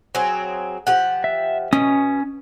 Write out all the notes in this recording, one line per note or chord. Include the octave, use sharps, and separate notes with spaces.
F#3 C4 G#4
F3 G4 F#5
E5
B2 C#4 D#6